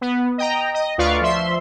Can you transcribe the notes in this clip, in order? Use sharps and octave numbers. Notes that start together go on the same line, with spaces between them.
B3
D#5 G5 A#5
D#5
D2 F4 B4 D5 F5 C#6
F3 E5 C6